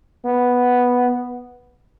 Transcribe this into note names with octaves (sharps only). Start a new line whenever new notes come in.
B3